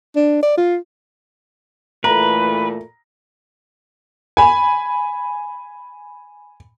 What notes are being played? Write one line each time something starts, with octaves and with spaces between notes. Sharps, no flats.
D4
D5
F4
A#2 E3 A3 B4 A#5
G#5 B5